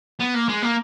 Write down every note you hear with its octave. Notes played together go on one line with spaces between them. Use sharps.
B3
A#3
G#3
A#3